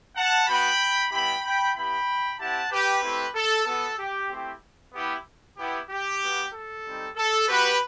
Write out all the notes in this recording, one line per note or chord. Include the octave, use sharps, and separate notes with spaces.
F#5 A5
B3 F#4 G5 B5
G3 B3 E4 G4 G5 B5
G5 B5
B3 E4 G4 G5 B5
C4 E4 G4 F#5 A5
G4 B4
A3 C4 E4 G4
A4
B3 F#4 A4
G4
A3 C4 E4 G4
B3 E4 G4
B3 E4 G4
G4
B3 F#4
A4
G3 C4 D#4
A4
B3 F#4 G4 B4